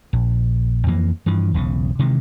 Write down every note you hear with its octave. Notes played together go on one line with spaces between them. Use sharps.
A#1
F2 E3 A#3
G2 E3 F3
E1 B1 C#3
C3 D#3 E3 G#3